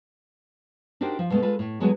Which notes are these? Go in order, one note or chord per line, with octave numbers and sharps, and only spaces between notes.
D4 D#4 F#4 G4 A#4 C5
F3
B2 D3 G#3 A3 B3
G#3 F4 A4 B4
A2
D3 F#3 G#3 B3 F#4 G#4